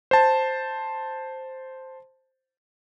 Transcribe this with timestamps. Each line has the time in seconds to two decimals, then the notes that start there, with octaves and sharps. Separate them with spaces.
0.11 C5 A5